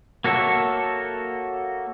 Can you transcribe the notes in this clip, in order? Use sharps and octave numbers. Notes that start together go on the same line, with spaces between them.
A#3 F#4 A4 C#5 E5